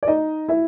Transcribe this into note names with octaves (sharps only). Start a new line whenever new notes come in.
D5
D#4 D#5
E4 E5